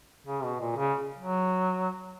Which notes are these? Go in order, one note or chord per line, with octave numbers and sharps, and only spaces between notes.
C#3
B2
A#2
C#3
F#3